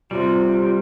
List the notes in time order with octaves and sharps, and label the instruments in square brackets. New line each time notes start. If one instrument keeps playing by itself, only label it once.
[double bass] C3 [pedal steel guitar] G3 [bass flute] F4